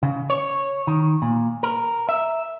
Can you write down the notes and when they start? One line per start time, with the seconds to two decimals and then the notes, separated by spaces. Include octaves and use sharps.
0.03 C#3
0.30 C#5
0.87 D#3
1.22 A#2
1.63 A#4
2.09 E5